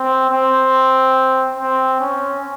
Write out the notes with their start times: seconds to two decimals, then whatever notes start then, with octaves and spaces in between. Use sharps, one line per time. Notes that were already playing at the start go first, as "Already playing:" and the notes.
Already playing: C4
0.29 C4
1.57 C4
2.00 C#4